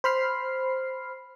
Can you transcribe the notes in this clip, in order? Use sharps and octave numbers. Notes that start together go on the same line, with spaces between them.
C5 B5 F6 C7